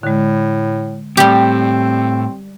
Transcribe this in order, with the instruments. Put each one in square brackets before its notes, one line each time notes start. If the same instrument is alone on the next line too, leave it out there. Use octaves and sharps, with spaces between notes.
[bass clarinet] A2 [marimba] D3 G#3
[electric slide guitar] A2 [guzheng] G3 G4 [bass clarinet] C4